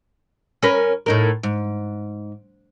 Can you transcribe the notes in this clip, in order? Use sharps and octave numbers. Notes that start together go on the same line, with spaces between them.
C#4 A#4 B4
A2 D#4 A#4
G#2